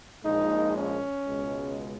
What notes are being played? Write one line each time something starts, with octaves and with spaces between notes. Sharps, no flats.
A#1 A#2 G#3 D#4
C#4
C#2 B2 G#3